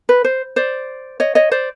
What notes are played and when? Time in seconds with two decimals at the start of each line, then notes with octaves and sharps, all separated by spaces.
0.09 B4
0.24 C5
0.56 C5 D5
1.20 C#5 D#5
1.35 C#5 D#5
1.51 C5 D5